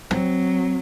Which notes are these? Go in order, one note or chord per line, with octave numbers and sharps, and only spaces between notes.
F#3 C4